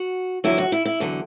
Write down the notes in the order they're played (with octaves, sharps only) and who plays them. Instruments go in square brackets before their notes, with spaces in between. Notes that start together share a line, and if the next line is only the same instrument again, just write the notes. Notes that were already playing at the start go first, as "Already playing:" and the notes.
Already playing: [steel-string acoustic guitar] F#4
E2 D3 F#3 E4
F#4
E4
E4
E2 D3 F#3